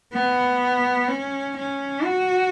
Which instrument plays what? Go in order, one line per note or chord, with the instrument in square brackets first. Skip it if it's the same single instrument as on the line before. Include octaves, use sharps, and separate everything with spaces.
[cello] B3
C#4
C#4
F#4